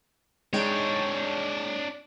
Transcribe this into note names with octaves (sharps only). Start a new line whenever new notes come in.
G#3 D4 D#4 C#5 G5